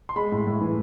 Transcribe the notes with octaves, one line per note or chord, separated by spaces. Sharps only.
C6
G#3 B5
A2
A2
E3